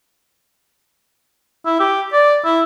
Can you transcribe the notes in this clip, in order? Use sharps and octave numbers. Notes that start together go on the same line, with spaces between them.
E4
G4
D5
E4